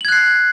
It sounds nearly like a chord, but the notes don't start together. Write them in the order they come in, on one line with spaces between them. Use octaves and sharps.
F#7 G#6 F#6 C7